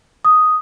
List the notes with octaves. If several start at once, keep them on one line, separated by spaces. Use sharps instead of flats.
D#6